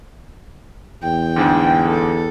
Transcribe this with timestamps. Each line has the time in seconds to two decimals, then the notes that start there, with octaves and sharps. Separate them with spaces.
1.03 E2 G5
1.36 D2 G#2 D3
1.88 A4